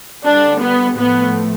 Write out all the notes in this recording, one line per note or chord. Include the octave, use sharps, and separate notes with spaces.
D3 G3 D4
B3
A2 F3 A3 B3